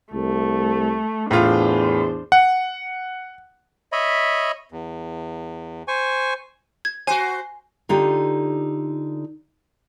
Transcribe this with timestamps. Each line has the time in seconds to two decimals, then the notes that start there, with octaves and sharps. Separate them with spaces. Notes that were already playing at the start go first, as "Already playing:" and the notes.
0.13 C2 A3
1.31 E2 A2 D4 F4 C5
2.32 F#5
3.92 C#5 D#5 E5 B5
4.72 E2
5.88 C5 G#5 C#6
6.85 G#6
7.07 F#4 C5 G#5
7.89 D3 D#4 F4 G4